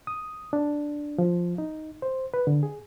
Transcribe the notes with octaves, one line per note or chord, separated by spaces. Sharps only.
D#6
D4
F3
D#4
C5
B4
D3
G#4